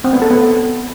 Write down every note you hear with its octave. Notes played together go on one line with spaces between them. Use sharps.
C4
B3
A4
B3